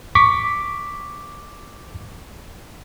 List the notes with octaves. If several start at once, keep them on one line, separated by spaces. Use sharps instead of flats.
C#6 D6 B6